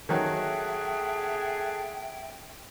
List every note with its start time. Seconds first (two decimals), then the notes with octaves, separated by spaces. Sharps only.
0.09 D#3 F#3 G#4 A4 E5 F#5 G5